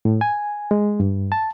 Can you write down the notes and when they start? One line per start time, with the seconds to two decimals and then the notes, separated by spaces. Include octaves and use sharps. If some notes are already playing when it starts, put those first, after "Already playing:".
0.05 A2
0.21 G#5
0.71 G#3
1.00 G2
1.32 A5